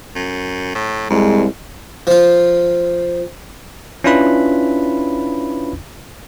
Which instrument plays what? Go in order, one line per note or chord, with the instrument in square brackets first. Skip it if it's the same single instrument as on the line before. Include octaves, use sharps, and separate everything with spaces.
[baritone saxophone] F#2
A2
[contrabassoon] C2 [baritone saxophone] F2 [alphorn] G#3
[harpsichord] F3 F4
[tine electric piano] C#4 D4 E4 F4 B4 B5